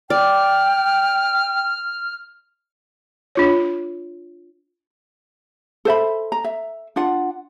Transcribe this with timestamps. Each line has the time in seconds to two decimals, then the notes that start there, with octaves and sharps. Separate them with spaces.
0.10 D5 G5 F6
3.35 D4 F4 C#5
5.85 A4 C5 E5 B5
6.32 A#5
6.44 E5
6.96 D4 F4 F#5